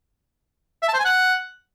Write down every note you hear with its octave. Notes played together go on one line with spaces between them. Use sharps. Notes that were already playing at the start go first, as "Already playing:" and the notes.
E5
A5
C5
G#5
F#5